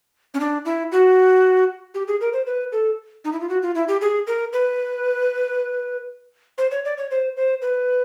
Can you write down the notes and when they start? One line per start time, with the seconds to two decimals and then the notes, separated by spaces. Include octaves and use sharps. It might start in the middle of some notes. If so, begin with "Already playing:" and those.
0.34 C#4
0.40 D4
0.65 E4
0.92 F#4
1.94 G4
2.08 G#4
2.21 A#4
2.33 C5
2.46 B4
2.72 A4
3.24 D#4
3.32 E4
3.40 F4
3.49 F#4
3.62 F4
3.75 E4
3.88 G4
4.01 G#4
4.27 A#4
4.53 B4
6.58 C5
6.71 C#5
6.85 D5
6.98 C#5
7.11 C5
7.36 C5
7.62 B4